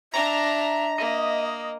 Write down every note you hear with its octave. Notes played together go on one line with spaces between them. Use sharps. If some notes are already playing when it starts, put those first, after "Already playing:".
D4 E5 A#5
A#3 D#5